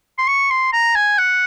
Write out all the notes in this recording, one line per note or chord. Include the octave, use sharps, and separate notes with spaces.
C6
C#6
C6
A#5
G#5
F#5